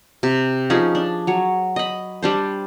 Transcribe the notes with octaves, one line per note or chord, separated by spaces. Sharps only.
C3
F3 C#4 D#4 G#4
D4
F#3 C#5
D#5 B5
G3 D4 C5